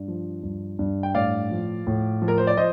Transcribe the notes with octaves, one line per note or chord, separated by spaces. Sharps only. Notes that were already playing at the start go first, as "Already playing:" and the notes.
Already playing: G2
F3
G2
G2
G5
A2 D5 F5
F3
A2
F3
A#4
C5
D5
F3 C5 D#5